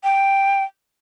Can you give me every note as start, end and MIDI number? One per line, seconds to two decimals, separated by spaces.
0.04 0.64 79